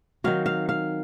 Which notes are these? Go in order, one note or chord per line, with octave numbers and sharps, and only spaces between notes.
D#3 F#3 C4 F5
F5
F5